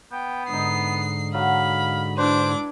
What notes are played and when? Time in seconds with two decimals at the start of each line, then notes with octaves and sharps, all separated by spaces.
0.12 B3 G5
0.49 G#2 D3 D#4 D#5 C7
1.34 F#3 F5 B5
2.18 D4 E4 B4 C5 D6